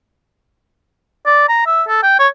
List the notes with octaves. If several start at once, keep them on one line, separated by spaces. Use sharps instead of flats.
D5
A#5
E5
A4
G5
C#5